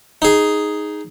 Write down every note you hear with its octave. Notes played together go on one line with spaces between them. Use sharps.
D#4 G#4